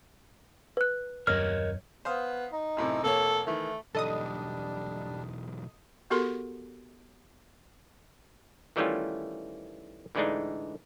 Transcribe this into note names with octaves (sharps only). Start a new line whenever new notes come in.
B4 F#6
D#1 F#2 A#4 C#5 D#5 F6
B3 C5 F5 D#6
D#4
F#2 A2 C3
F1 A#3 A4 C#5
D#3 E3 A3
B1 E2 G3 D4 A4 D#5 D#6
B3 F#4 G4 A4 A#4 C6
D#3 E3 G3 A3 C#4 F4
A2 D3 E3 G#3 D4 D#4